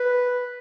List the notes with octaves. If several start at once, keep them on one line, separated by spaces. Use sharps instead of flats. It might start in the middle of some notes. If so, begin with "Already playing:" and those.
Already playing: B4